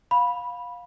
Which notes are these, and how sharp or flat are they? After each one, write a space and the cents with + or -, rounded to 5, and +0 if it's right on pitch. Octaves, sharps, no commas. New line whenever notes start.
F5 +20 B5 -10